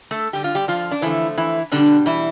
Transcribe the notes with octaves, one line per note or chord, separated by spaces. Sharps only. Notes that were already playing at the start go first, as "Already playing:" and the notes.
A3 A4
D3 G3 G4
F4
G3 G4
F3 F4
D4
D3 E3 F3 A3 E4
E3 E4
B2 D3 G3 D4
E3 E4